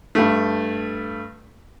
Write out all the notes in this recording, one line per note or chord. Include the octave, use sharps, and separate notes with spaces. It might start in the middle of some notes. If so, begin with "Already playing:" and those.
G2 A3